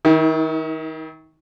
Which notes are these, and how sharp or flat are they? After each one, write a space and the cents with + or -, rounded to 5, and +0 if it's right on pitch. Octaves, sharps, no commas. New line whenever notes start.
D#3 +25 E4 -40